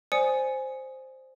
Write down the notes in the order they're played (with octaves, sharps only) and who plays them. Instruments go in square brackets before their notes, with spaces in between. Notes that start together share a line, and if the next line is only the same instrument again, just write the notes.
[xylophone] C5 D5 G#5 D#6 C#7